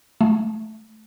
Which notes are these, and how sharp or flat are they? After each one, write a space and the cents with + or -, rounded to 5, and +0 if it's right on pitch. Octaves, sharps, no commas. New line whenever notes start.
A3 -15